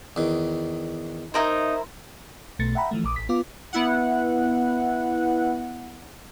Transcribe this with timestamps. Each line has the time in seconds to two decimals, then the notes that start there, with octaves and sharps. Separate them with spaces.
0.16 E2 D#3
1.34 D#4 E4 A#4 C5
2.59 B1 B2 A3 A6 C#7
2.75 E5 F#5 G5 A#5 B5
2.91 E3 F3 A3
3.04 A#1 D6 D#6
3.16 A1 B6
3.29 B3 F4 D6
3.73 B3 E4 F#5